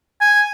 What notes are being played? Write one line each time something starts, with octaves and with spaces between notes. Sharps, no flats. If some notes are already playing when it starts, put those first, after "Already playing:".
G#5